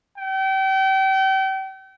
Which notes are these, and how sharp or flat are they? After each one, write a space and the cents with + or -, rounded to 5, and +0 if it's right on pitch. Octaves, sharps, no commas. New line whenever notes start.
G5 -35